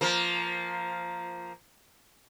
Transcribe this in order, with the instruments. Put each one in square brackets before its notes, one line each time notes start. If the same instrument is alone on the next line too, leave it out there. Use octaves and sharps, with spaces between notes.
[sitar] F3 A#3